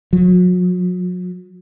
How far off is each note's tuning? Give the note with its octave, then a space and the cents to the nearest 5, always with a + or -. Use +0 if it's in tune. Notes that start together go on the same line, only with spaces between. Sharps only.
F#3 -40